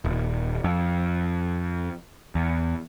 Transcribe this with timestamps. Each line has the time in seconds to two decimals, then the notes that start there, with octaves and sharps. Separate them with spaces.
0.05 D#1
0.64 F2
2.35 E2